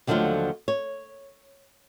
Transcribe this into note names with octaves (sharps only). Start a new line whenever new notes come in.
D#2 D3 F3 F#3 A3 F4
C#5